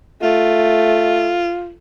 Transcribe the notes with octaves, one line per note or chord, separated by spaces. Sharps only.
A3 F4